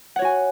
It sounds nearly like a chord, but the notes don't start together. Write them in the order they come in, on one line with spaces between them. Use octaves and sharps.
F#5 C#5 F#4 G#5